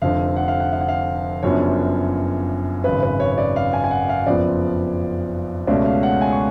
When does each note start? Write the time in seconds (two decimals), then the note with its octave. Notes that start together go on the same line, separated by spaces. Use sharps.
0.02 F1 F2 D3 F5
0.36 F#5
0.48 F5
0.60 F#5
0.73 F5
0.81 F#5
0.88 F5
1.43 F#1 F#2 F3 B3 D4 C#5
2.84 G#1 F#2 C#3 B4
3.03 B4
3.20 C#5
3.31 C#5
3.38 D5
3.56 F5
3.73 G#5
3.84 G#5
3.91 F#5
4.09 F5
4.26 F#1 F2 F3 B3 D5
5.67 C#2 B2 A3 C#4 D5
5.85 F5
6.03 F#5
6.21 G#5
6.32 C#6